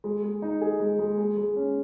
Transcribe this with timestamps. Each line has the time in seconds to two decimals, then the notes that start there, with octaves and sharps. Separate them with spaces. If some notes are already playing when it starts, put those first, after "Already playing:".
0.04 G#3
0.23 G#3
0.42 D#4
0.61 G#4
0.80 G#3
0.99 G#3
1.18 G#3
1.37 G#3
1.56 C#4